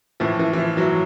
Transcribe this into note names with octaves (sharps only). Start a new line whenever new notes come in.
A2 E3 F3
E3
E3
F3
E3 F#3